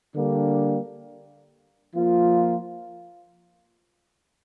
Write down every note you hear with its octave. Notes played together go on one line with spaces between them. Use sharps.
D3 G3 A#3 D4
F3 A#3 F4